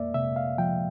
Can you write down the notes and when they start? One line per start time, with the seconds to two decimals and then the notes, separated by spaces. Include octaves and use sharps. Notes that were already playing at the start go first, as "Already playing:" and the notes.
Already playing: F2 A#3 D5 E5
0.14 C3 E5
0.36 F5
0.58 F3 G5